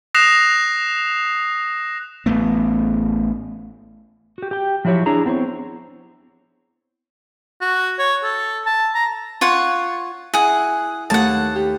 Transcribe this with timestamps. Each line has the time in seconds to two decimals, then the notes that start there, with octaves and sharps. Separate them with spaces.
0.14 D#6 F#6 A#6 C7 E7 F7
2.26 A1 A3 B3
4.38 F#4 G4
4.51 G4 G5
4.85 F3 F#3 E4 G4 C#5
5.06 D4 E4 G#4 A#5
5.26 B3 C4 E4 C#5
7.61 F#4
7.99 C#5
8.24 A4
8.66 A5
8.95 A#5
9.41 F4 C#5 F#5
10.34 E4 G#4 F#5
11.10 D#2 A3 F#5 A5
11.56 G4